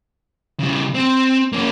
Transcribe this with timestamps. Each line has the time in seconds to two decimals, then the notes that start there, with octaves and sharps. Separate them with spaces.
0.60 C#3 G3
0.95 C4
1.53 A#3 C#4